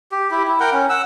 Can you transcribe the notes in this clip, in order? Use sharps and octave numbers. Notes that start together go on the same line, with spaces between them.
G4
E4 G4
E4
A#4 F#5 G5
C#4
F#5 E6